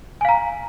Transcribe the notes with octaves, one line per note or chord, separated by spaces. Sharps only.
F5 G#5 A#5